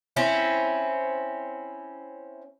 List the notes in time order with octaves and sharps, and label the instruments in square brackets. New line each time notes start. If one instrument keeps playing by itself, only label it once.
[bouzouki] C4 C#4 E4